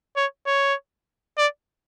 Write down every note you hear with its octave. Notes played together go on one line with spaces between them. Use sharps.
C#5
C#5
D5